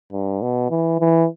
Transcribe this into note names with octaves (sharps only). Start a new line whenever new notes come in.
G2
B2
E3
E3